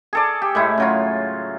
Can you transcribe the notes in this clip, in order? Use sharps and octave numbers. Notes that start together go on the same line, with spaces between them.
G#4 A4 D5
G4
A2 G#3 E4
C#3 F#3 F4